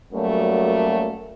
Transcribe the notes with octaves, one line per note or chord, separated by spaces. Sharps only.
F#2 F#3 G3 A3 A#3